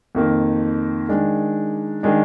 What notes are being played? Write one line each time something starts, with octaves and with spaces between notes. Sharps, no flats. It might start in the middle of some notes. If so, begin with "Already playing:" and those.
F2 D#3 A#3
D#3 G#3 D4
D#3 G#3 D4